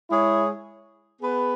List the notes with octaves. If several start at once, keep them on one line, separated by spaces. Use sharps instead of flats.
G#3 E4 G#4 C#5
B3 G#4 B4